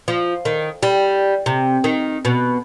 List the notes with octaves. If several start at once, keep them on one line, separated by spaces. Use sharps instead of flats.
F3
D#3
G3
C3
D#3
B2